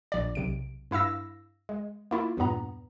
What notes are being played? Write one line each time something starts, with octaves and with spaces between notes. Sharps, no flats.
A#1 D5
B1 C3 D7
G2 E4 F5 E6 A#6
G#3
A#3 E4 F4
E2 G2 A#2 B3 A#5